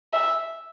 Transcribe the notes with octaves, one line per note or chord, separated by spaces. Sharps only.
E5